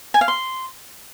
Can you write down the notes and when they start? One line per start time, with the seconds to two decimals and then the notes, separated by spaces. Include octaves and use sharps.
0.14 G#5
0.21 F5
0.28 C6